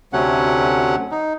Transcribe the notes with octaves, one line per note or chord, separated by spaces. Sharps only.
D2 C3 F#3 A3 C#4 F#5
D#4